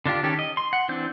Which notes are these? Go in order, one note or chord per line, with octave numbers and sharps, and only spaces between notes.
D3 D4 F4 G4
D#3 C#4 G4 A4
D#5
C6
F#5
E3 C4 D4 G6